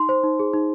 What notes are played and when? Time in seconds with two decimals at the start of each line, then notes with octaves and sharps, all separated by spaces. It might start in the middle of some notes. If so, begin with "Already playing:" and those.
Already playing: D#4 C6
0.09 C5
0.24 D#4
0.39 G#4
0.53 D#4